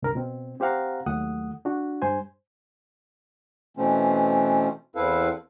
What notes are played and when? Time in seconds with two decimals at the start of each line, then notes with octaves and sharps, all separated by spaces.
0.02 C2 G2 A#4
0.15 B2 C4
0.60 C4 G4 C5 F5 F#5 A#5
1.06 D#2 F#3 A3 F#5 D#6
1.65 D4 F#4
2.02 G2 C5 G#5
3.77 B2 E3 A3 C4 C#4
4.96 E2 C4 E4 A4 B4 F5